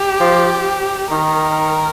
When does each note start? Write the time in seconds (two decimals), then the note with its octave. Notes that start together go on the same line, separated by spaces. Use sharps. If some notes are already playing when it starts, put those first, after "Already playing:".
Already playing: G4
0.20 F3
1.11 D#3 A#4